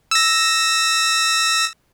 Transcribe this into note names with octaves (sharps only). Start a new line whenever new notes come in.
E6 A#6